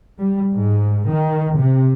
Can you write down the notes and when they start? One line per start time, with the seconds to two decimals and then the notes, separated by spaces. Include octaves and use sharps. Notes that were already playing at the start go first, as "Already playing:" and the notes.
0.19 G3
0.52 G#2
1.08 D#3
1.59 C3